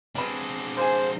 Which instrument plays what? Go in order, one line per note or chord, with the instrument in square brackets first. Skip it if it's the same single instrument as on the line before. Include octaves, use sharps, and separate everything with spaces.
[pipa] G3 B3 B5 [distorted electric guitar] G#3 D4 [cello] C4
[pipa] A#3 G#4 [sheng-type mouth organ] C5